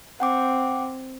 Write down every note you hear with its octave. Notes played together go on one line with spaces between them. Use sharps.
C4 F#5 G5 D6